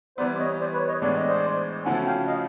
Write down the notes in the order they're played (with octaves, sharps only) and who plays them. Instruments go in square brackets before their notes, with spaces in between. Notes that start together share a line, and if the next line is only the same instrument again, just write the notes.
[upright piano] E3 G3 B3 [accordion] C5 D5
[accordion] C#5 D#5
C5 D5
B4 C#5
C#5 D#5
[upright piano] A2 E3 G#3 B3 D4 [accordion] D5
[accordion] D#5
C5 D5
[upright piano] C#3 F3 A3 C#4 F#4 [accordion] F#5 G#5
[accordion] F5 G5
D#5 F5